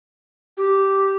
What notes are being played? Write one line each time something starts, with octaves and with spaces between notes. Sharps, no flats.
G4